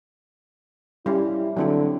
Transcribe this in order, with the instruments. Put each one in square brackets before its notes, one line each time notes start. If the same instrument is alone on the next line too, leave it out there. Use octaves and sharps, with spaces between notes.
[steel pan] G3 C#4 [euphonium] E4
[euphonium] D3 [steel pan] F#3 C4 E4